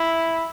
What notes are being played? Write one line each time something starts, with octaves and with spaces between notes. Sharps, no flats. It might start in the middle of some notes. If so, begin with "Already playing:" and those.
Already playing: E4